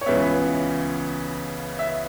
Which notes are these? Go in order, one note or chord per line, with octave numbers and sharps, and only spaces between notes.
C#5
C#2 C#3 E3 B3 E5
E5